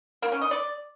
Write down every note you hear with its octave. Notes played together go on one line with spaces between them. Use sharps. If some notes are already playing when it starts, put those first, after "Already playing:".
A#3
C#4
D#5
D5